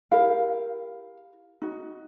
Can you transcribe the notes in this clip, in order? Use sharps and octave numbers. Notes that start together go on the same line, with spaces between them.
E4 G4 A#4 F5
D#4 F#4